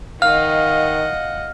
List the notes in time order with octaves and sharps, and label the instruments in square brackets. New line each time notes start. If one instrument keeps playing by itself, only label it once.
[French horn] D#3 [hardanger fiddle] D#5 F#5 [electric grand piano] F5 [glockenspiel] F6